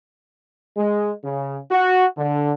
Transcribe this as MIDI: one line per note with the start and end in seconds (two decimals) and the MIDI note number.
0.77 1.13 56
1.24 1.59 49
1.71 2.06 66
2.18 2.54 50